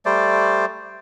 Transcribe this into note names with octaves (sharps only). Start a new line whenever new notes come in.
G3 A3 C5 D5